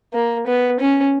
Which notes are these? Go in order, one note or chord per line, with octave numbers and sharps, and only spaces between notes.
A#3
B3
C#4